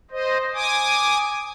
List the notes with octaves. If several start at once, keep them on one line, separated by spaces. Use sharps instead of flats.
C5 D#5
G#5 D6 D#6